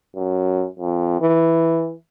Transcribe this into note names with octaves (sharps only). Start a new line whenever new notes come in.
F#2
F2
E3